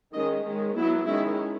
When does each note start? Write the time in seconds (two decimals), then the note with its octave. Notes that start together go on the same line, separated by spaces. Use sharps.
0.13 D#3 G#3 C#4 D#5
0.45 D#3 G#3 C#4
0.75 F#3 B3 E4
1.06 D#3 G#3 C#4 E4